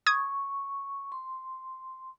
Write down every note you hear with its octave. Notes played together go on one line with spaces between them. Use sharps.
C#6 D#6 G#6
C6